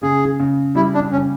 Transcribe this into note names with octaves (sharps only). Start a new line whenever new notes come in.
C#3 G#4
C#3
G3 E4
D4
C#3 C#4